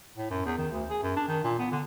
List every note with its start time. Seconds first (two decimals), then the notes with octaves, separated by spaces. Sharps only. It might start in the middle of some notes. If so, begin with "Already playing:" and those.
0.17 A2
0.30 F#2
0.45 E2
0.58 D#3
0.71 D2
0.90 G#4
1.02 F#2
1.16 D4
1.28 D#3
1.44 A#2
1.58 B3
1.71 D3